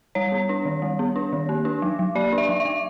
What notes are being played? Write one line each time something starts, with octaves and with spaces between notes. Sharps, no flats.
G3 C#5
B3
D4
D#3
G3
B3
D4
D#3
A#3
D4
F#3
F#3
A#3 D5
D4
E5
F#3
E5
F#3